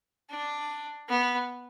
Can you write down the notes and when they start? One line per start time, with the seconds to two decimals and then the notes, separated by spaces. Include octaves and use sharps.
0.30 D4
1.08 B3